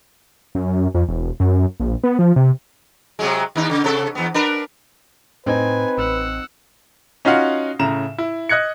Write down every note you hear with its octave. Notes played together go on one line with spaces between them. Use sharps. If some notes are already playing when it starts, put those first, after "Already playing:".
F#2
F2
E1
F#2
A#1
B3
F3
C3
C3 F#3 G#3
D#2 D#4
C#3
C3 A4
E2 B3
D4 A#4 B4
A2 C4 D#4 B4 G#5
A1 F#5 E6
C#4 D#4 F4 F#4 F5 F#5
A2 C#3 A#5 E7
E4
D#5 F#6 G#6 C#7